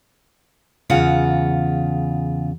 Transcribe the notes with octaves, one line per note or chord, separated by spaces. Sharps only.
E2 C#3 F4 F#5